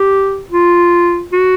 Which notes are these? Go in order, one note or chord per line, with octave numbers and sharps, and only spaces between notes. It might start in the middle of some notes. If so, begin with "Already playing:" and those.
Already playing: G4
F4
F#4